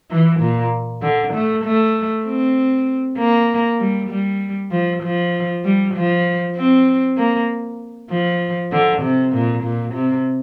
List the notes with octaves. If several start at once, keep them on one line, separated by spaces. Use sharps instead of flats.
E3
A#2
D3
A3
A3
C4
A#3
G3
G3
F3
F3
G3
F3
C4
A#3
F3
D3
C3
A#2
A#2
C3